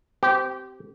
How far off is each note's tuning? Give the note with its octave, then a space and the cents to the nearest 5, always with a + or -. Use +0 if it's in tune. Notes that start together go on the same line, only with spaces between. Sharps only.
C4 -10 G4 -20